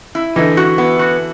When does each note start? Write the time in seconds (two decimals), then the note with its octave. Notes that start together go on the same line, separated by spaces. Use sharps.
0.15 E4
0.36 D3 E3 D#4
0.57 F#4
0.78 B3
0.99 F#4